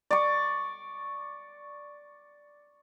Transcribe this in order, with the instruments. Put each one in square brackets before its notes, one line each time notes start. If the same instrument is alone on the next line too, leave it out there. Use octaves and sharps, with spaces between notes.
[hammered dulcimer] D5 C#6